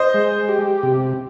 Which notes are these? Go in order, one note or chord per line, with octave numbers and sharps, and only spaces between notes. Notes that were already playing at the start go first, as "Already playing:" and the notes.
Already playing: C5 D#5
G#3
G4
C3